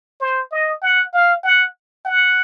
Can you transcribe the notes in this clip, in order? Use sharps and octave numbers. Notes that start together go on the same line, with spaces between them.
C5
D#5
F#5
F5
F#5
F#5